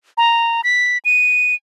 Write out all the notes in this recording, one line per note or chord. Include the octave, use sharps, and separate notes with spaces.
A#5
B6
D#7